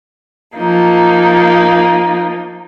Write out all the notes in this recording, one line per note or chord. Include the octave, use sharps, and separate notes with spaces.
F3 A#3 D#4